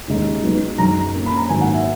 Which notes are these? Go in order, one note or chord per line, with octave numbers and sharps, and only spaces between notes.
D#2 C#3 G#3 D#4
B1 B2 G#3 B3 D#4
F#2 C#3 G#3 D#4 A#5
A#2 A#3 C#4
B5
A#5
G#1 G#2 D#3 F#3 A#3 G#5
F#5
E5